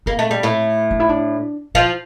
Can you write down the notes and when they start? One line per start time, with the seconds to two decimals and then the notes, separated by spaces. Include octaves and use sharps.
0.06 A#3 C4
0.19 A3
0.31 G3
0.43 A2 A3
0.91 D4
1.00 E4
1.09 D4
1.75 F3 E4 F4